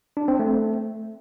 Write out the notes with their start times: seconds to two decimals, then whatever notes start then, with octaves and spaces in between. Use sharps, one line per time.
0.17 D4
0.28 C4
0.39 A3